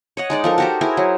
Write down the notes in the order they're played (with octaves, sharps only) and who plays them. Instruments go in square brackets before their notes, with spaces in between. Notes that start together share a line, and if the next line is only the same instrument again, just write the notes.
[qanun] C#5 D#5 F#5
G#3 D#4 D5
F3 A4 A#4
F#4 G4 C5
E4 G#4 A#4 C5
F#3